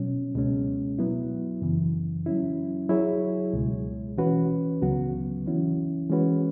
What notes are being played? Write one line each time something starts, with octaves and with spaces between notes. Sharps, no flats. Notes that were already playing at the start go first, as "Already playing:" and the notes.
Already playing: B2 F#3 C#4
C#2 B2 G#3 C#4
F#3 B3 E4
F#2 C#3 E3
F#3 C#4 E4
F#3 E4 G#4 C#5
C#2 B2 G#3
E3 C#4 F#4 B4
C#2 C#3 F#3 B3 F#4
E3 C#4 E4
E3 G#3 C#4 F#4 B4